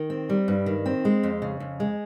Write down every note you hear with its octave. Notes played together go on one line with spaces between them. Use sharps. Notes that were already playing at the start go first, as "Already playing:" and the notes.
Already playing: D#3
C4
G3
G2
D#3
C4
G#3
F2
C#3
F2
G#3